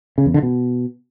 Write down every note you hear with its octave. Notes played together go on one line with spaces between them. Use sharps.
C#3
E2
D3
B2